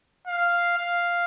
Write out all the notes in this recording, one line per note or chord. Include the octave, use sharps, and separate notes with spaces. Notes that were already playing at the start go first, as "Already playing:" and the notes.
F5
F5